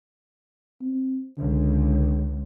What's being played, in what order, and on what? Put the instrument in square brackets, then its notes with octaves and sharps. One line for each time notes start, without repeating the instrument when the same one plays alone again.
[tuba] C4
[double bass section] C#2 [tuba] D3